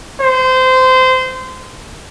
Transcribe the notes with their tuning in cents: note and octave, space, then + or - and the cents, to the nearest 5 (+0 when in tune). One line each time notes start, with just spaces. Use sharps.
C5 -20